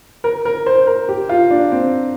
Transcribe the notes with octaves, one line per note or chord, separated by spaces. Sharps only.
A#4
A#4
C5
A#4
G4
F4
D4
C4